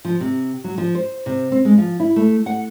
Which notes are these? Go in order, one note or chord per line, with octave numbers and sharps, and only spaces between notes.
F3
C3
F#3
F3
C5
C3
C4
G#3
F3
E4
A3
F#5